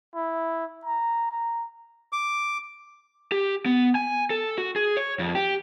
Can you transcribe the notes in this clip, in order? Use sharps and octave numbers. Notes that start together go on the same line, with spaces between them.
E4
A#5
A#5
D6
G4
B3
G#5
A4
F#4
G#4
C#5
F2
G4